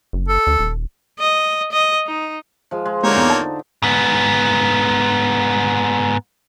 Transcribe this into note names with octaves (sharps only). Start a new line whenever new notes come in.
F#1
A4
D2
D#1
D#5
D#5
D#4
F3 G#3
G#3
D3 G#3 A#3 C4 D#4 C#5
E2
A5
G#2 B3